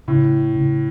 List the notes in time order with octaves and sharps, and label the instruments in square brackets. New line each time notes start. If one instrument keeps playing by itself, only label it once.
[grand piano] A2 [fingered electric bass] C#3
[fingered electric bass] C#3